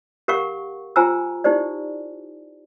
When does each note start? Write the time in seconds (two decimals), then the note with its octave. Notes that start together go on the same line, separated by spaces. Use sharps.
0.28 G4 A#4 F5 F#5 C#6
0.96 F4 C5 G5 G#5 A#5 E6
1.44 D#4 E4 G4 C5 D5